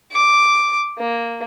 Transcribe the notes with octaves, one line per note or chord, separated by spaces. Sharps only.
D6
A#3